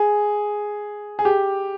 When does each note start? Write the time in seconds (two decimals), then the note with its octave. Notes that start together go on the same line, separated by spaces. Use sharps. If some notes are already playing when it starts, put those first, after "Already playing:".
Already playing: G#4
1.19 G#4
1.25 G4